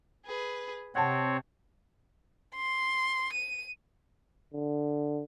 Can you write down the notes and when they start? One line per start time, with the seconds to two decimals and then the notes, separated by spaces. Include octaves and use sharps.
0.25 G#4 B4
0.95 C3 C4 C#5 F#5 A5
2.56 C6
3.33 D#7
4.54 D3